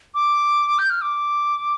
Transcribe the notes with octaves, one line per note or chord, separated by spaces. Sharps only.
D6
G6
F6
D6